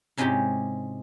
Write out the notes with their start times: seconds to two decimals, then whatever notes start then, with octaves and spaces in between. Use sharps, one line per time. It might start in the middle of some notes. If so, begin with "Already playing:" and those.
0.17 G#2 C3 G#3 C#4 E4 G4